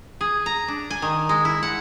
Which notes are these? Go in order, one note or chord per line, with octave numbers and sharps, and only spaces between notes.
G#4
A#5
D4
G#5
D#3
G#3
E4
F#5